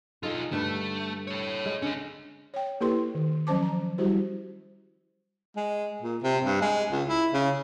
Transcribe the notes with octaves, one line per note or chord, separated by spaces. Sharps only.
B1 G#3 D#4 F4 A4
G2 D3 A3 B4
A4 C#5
G#3
D3 C#4 D#5
C#5 G5
A#3 E4 G4 A4 B4 C6
D#3
F3 F#3 C#4 C5 A5 D6
A#5
G3 E4 F#4 G4 C5
G#3
A#2
C3
G2
G#3
C#2
E4
C#3